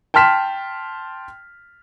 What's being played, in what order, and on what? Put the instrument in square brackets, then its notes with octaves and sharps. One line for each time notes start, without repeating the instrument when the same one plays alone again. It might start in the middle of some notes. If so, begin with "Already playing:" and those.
[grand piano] G5 A5 C6 F6 B6 E7